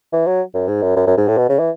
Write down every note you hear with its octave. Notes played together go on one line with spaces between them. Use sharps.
E3
F#3
F#2
G#2
F#2
F#2
F#2
G#2
A2
B2
C#3
E3